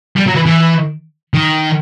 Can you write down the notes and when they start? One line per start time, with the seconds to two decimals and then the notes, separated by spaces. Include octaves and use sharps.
0.17 G3
0.27 F#3
0.36 E3
0.46 E3
1.34 D#3